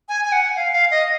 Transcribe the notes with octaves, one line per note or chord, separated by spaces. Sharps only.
G#5
G#5
F#5
F5
F5
D#5